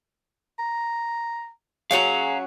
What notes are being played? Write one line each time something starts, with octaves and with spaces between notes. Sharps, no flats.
A#5
F#3 C#4 F#4 G#4 F5 A#5